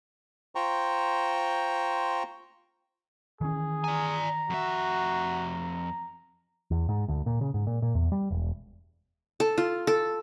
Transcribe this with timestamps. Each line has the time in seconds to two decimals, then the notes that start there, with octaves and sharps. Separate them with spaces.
0.55 F4 C5 G5 A#5 C#6
3.41 D#3 E3 C#4 G#4
3.84 D5 G#5 A#5
4.50 F2 F#4 E5
6.71 E2
6.89 G#2
7.08 D2
7.26 A#2
7.41 C#3
7.54 G#2
7.67 A#2
7.82 A#2
7.95 E2
8.12 G3
8.30 E1
9.40 A4
9.58 F4
9.87 A4